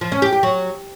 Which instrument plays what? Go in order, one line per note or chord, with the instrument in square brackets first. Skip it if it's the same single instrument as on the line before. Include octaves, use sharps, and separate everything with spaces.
[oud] F3
C#4
G4
G4
F#3